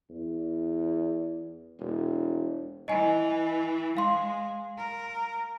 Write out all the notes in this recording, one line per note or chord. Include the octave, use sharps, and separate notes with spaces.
E2
E1
E3 D#5 G#5
G#3 F5 C6
A#4